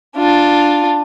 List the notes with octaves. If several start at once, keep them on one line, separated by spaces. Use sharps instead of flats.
D4 F4